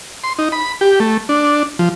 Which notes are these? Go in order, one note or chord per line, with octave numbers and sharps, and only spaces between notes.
C6
D#4
B5
G4
A3
D4
F3